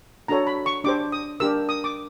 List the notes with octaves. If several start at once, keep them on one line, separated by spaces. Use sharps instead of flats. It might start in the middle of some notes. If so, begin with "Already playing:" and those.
D4 F#4 A4 C#5 A#5
B5
C#6
D4 G4 C5 D6
D#6
D4 G4 A#4 E6
D#6
D6